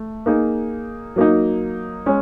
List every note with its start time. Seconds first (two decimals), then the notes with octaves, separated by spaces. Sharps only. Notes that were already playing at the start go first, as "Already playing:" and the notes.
Already playing: A3
0.26 A#3 D#4 G#4
1.16 F#3 A#3 D#4
2.06 G#3 C#4